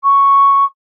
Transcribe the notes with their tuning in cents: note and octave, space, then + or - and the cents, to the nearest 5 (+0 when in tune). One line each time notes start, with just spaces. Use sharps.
C#6 +0